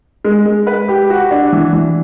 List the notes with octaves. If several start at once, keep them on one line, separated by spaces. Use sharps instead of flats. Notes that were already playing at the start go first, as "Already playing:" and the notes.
G#3
G#3
B4
G4
F#4
D4
E3
E3